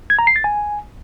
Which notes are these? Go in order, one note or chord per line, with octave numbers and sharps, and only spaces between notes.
G#6
A#5
C7
A6
G#5